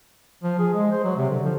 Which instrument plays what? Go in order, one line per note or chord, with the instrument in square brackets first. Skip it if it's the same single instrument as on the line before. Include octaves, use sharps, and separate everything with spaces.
[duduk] F3
G#4
G#3
C5
F#3
C3
D3
F3